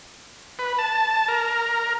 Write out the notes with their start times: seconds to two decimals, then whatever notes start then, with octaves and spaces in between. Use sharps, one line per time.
0.59 B4
0.79 A5
1.28 A#4